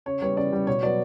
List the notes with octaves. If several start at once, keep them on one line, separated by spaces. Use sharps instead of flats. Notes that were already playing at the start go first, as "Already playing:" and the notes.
C#3 C#5
G3 B3 C#5
C#3 D5
G3 B3
B2 C#5
F#3 B3 D5